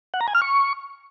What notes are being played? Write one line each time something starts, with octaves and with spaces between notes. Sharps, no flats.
F#5
A#5
G#5
F6
C#6